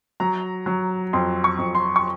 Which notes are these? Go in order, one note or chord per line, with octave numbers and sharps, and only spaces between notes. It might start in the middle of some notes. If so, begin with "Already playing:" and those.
F#3 A#5
F#3
F2 C6
C#6
F2
C6
C#6